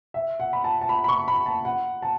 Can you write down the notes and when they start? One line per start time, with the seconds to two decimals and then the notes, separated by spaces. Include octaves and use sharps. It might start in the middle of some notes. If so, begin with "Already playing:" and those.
0.14 E5
0.40 F#5
0.53 B5
0.64 A5
0.81 A5
0.89 B5
1.04 B5
1.09 C#6
1.28 B5
1.46 A5
1.65 F#5
2.02 A5